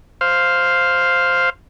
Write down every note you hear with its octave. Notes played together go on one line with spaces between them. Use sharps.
C5 F5